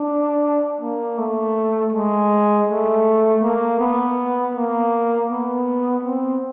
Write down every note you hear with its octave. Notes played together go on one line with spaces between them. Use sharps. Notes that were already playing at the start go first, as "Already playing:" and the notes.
Already playing: D4
A#3
A3
G#3
A3
A#3
B3
A#3
B3
C4